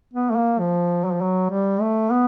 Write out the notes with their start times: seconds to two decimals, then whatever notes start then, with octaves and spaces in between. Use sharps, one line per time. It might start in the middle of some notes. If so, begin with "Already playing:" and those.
0.14 B3
0.30 A3
0.36 A#3
0.60 F3
1.05 F#3
1.13 F3
1.21 F#3
1.50 G3
1.81 A3
2.11 B3